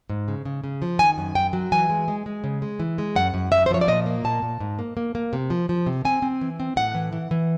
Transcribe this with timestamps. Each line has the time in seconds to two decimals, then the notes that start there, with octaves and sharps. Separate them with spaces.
0.10 G#2
0.28 C#3
0.45 C#3
0.64 C#3
0.82 F3
0.99 D#3 G#5
1.18 F#2
1.35 F#2 G5
1.53 F#3
1.72 E3 G#5
1.90 G#3
2.08 G#3
2.26 G#3
2.44 C#3
2.62 G#3
2.80 E3
2.98 G#3
3.16 F#2 F#5
3.34 F#2
3.52 F#2 E5
3.66 C5
3.71 F3 C#5
3.81 D5
3.88 A#2 D#5
4.06 A#3
4.24 A#2 A5
4.42 A#2
4.60 G#2
4.79 A#3
4.97 A#3
5.15 A#3
5.33 C3
5.50 F3
5.69 F3
5.87 C3
6.05 C4 G#5
6.22 C4
6.41 E3
6.60 C4
6.76 A2 F#5
6.95 E3
7.13 E3
7.31 E3